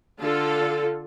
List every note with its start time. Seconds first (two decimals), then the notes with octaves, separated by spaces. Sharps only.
0.21 D3 F4 A4